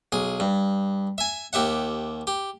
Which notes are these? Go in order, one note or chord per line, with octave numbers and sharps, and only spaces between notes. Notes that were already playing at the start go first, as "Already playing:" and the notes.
B1 G#4
G2
E5 G#5
D#2 G4 E5 F#5
G4